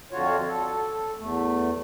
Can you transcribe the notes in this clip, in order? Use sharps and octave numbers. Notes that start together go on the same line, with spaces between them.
F2 D3 F4 F#4 C#5
A4
E2 A3